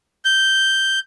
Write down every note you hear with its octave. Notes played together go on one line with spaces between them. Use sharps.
G6